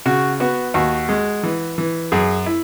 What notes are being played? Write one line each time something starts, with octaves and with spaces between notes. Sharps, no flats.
C#3 F#4
B3 F#4
D#2 F#4
G#3
E3
E3
F#2 G#4
E4